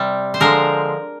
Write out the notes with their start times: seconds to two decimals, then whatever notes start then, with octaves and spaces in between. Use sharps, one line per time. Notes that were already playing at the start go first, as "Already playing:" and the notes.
Already playing: C3 G3
0.34 C5
0.40 D3 F3 G#3 A#4